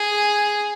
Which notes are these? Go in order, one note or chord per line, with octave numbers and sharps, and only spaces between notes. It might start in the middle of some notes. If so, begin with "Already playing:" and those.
Already playing: G#4